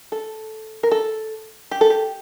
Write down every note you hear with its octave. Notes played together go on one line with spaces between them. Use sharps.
A4
A#4
A4
G4
A4
G4